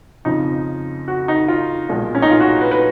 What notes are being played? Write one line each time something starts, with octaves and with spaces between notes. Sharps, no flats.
F2 C#3 F3 D#4
F#4
D#4
F4
B1 A#2 F3 G#3
C#4
D#4
F4
F#4
B4
B4